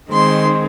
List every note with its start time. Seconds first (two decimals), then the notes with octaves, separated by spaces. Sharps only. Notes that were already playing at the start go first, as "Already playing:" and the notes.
0.11 D#3 G#3 C4 C6